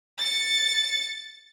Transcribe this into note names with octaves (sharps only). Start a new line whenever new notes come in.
A6 C#7